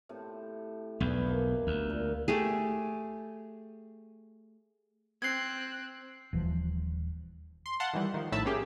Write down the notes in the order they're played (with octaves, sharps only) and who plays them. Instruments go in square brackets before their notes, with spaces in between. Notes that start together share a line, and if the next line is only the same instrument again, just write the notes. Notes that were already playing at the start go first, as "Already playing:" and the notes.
[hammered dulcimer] A2 C3
[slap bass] B1 E2 [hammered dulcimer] G2 E3 B5
[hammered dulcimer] B2 A#3
[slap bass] D2
[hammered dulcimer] A#2 A#5
[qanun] A3 G4 G#4
[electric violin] C4 F#6 [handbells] G#6 C7
[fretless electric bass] D#1 E3 F3
[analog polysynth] C6
F5 F#5 A5 C6
D#3 E3 G3
D#3 F3
A#1 A2 D#3 E5 A5 B5
A#3 C#4 G4 G#4